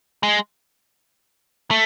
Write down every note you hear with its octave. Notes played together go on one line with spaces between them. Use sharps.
G#3
A3